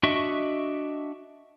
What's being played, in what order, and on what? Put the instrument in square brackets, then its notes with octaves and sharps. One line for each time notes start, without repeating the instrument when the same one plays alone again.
[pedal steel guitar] D4 F#4 D#5 E5 C#6